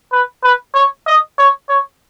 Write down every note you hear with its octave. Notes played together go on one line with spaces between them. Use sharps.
B4
B4
C#5
D#5
C#5
C#5